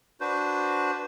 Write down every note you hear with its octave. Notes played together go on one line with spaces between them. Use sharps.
D4 F#4 B4 C5